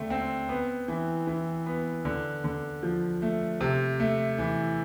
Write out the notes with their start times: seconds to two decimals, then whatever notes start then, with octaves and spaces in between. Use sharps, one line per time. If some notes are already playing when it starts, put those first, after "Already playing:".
Already playing: D3 A3 C4
0.10 C4
0.49 B3
0.88 E3
1.27 E3
1.66 B3
2.05 D3
2.44 D3
2.83 F3
3.22 A3
3.61 C3
4.00 A3
4.38 E3